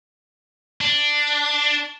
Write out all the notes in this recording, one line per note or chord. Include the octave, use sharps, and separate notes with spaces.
D4